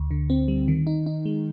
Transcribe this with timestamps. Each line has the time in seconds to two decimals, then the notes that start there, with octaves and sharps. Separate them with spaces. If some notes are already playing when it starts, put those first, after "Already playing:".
Already playing: D2
0.11 D3
0.30 C4
0.48 G3
0.68 D#3
0.87 D#4
1.06 D#4
1.25 G#3